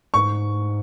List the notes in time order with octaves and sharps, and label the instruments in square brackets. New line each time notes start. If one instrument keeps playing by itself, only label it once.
[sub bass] G#2 [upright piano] C#6